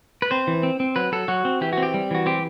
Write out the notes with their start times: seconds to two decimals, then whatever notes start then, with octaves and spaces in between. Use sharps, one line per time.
0.22 B4
0.31 C4 C5
0.47 E3
0.63 C4
0.80 C4
0.96 F#3 B4
1.12 F#3 A4
1.28 F#3 F#4
1.45 C4
1.61 E3 G4
1.73 C4 F#4
1.83 G4
1.94 G3
2.11 E3 F#4
2.26 C4 G4